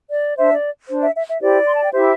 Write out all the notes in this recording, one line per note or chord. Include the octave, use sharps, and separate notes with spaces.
D5
D4 C5 E5
D5
D4 C5
E5
E5
E5
E4 G4 C5 D5
C6
A5
G5
E4 G4 C5 E5